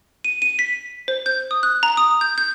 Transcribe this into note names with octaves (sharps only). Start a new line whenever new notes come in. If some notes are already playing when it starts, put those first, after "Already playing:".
D#7
D#7
B6
C5
G6
D#6
F#6
A#5
D#6
G6
G6